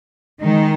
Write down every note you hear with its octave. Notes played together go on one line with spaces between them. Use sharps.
D#3 G#3 D#4